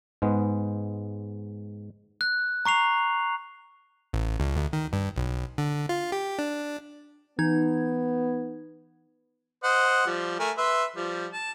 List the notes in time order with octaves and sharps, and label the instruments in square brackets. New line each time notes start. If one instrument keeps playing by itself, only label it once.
[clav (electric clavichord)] G#2 G#3 B3
[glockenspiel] F#6
A#5 C#6 C7 F7
[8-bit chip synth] A1
C#2
D2
D#3
G2
B1
D3
F4
G4
D4
[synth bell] E3 D#4 G#6 [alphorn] B3
[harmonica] C5 D#5 F#5
F3 G3
A3 A#4 G#5
B4 E5 C6
F3 G3
A5